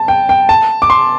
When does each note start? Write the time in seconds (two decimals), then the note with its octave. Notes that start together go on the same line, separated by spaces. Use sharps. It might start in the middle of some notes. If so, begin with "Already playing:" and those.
Already playing: A5
0.08 G5
0.29 G5
0.49 A5
0.82 D6
0.90 C6